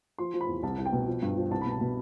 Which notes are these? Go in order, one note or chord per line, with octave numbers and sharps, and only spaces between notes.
F3 C6
F3
B5
E2
C2 A5
C2
G5
B2
F3
G2
F3
C2 A5
B2 B5
A5
B2